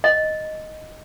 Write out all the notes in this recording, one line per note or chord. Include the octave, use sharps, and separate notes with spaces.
D#5